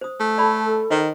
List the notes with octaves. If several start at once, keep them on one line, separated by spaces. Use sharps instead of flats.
C5 D#6
A3
A4 D5 A5 B5
D#3 C5 D#5 A#5